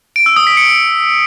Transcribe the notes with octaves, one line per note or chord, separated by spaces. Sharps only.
D7
E6
D#6
B6
C#7